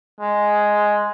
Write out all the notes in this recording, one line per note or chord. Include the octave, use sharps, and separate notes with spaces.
G#3